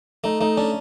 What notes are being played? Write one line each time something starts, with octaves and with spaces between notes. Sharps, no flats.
A3 D#4
A3 D#4
C#4 D4